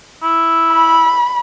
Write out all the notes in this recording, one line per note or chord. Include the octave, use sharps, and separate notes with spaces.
E4
B5